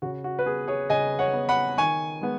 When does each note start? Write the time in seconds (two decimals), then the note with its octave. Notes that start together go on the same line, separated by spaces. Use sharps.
0.02 C#3 F#4
0.24 F#4
0.39 B4
0.46 B3 G#4
0.67 G#4 C#5
0.90 C#3 D#5 G#5
1.19 C#5 F#5
1.33 B3
1.49 F#5 B5
1.78 D#3 G#5 C#6
2.21 G#3 B3